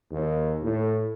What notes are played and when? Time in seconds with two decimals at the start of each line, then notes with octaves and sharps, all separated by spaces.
0.11 D#2
0.62 A2